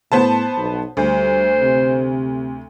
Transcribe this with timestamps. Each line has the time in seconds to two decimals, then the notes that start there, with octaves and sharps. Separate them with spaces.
0.12 A2 B3 C5 A5
0.58 B1
0.97 D2 G3 C5
1.60 C3